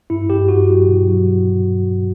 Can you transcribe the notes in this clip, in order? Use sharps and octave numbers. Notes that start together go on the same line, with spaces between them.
G2 E4
G2 G4
G2 F#4
F#3
B2
F#3